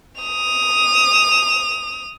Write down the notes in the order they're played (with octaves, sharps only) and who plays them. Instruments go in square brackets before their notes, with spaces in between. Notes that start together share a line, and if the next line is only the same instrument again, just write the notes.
[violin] D#6 F7